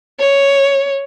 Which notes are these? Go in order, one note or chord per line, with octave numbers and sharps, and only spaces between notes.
C#5